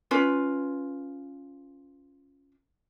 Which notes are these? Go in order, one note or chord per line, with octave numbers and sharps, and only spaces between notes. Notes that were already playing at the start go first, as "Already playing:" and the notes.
C#4 F4 B4